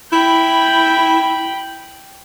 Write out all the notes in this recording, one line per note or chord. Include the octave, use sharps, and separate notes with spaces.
E4 G5 B5